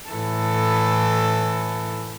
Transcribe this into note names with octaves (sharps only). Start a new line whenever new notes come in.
A2 E3 A4